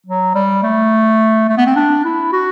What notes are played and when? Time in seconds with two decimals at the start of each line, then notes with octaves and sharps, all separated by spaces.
0.06 F#3
0.35 G3
0.63 A3
1.49 A3
1.58 B3
1.66 C4
1.76 D4
2.04 E4
2.32 F#4